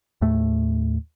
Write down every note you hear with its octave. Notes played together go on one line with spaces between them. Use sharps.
D#2 A2 A3